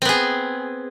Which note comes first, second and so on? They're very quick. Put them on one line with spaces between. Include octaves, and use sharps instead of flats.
C4 B3 G#4